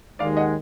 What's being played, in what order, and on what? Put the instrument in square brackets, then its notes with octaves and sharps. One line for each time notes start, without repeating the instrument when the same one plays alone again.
[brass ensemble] D#2 D#3 G#3 [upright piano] D5 F5
[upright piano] D#5 F#5